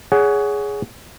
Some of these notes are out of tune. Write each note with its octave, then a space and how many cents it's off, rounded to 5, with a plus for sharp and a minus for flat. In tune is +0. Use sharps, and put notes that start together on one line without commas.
G#4 +0 C#5 +25 F#5 +10